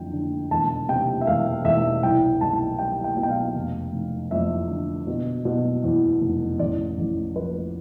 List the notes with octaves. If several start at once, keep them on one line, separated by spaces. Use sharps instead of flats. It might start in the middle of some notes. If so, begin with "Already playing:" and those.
Already playing: F2 D3 G5
D3
E1 A5
C3 G5
E5
E1 F5
E1 E5
C2 G5
C2 A5
G3 G5
G5
B2
G5
F5
F1
F1
F2 E5
D3
B2
B2
E2
F1
A1 D5
A1
F3 B4